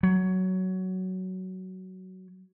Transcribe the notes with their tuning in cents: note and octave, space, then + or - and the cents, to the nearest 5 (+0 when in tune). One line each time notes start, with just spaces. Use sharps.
F#3 +10